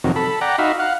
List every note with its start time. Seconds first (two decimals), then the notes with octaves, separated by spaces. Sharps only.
0.04 F2 C3 D#3 F#3
0.16 A4 B5
0.41 D5 F#5 G5 A#5
0.58 D#4 F#4 E5 F5 B5
0.79 F5 F#5